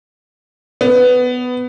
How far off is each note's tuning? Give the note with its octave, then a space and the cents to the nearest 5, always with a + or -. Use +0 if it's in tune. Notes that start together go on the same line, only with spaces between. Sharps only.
B3 +15